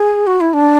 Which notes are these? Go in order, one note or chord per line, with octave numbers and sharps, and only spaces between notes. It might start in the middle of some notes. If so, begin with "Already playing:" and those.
Already playing: G#4
F#4
E4
D4